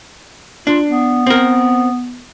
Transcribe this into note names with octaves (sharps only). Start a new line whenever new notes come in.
D4 F4
B3
C4 A#4